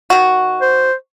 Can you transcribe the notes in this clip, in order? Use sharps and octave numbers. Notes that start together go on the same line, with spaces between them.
D#3 F#4
C5